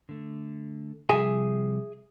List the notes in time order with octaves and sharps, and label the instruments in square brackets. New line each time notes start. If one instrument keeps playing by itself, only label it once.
[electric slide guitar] D3 A3
[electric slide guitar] C3 F3 G3 [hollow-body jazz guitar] G#4 E5 G#5